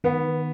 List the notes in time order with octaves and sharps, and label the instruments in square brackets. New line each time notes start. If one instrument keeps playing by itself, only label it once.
[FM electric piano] D#3 [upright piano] B3